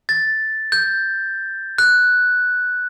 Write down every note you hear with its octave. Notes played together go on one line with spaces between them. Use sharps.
A6
G6
F#6